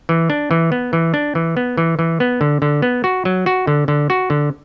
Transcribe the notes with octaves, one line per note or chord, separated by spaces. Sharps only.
E3
D4
E3
B3
E3
D4
E3
B3
E3
E3
B3
D3
D3
B3
F#4
F#3
F#4
D3
D3
F#4
D3